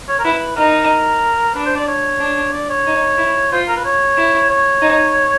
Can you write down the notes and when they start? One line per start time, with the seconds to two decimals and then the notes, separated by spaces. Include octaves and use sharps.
0.08 C#5
0.19 A#4
0.24 E4 B4
0.56 D#4 A#4
1.55 D4 B4
1.66 C5
1.76 D5
1.88 C#5
2.20 D4
2.53 D5
2.70 C#5
2.87 D#4
3.18 E4
3.52 F4 C5
3.68 A#4
3.76 B4
3.85 C#5
4.17 E4
4.50 C#5
4.82 D#4